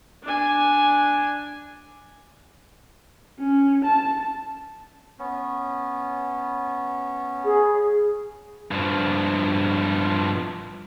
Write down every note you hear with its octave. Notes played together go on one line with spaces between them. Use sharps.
D4 G#5
C#4
A5
B3 C#4
G#4
G2 F3